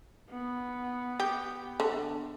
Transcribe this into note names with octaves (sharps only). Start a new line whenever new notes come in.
B3
G4
D3